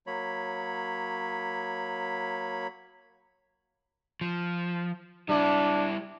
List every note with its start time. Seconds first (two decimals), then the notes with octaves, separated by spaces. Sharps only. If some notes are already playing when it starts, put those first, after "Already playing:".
0.07 F#3 A#3 C#5 B5
4.21 F3
5.29 G3 D4 E4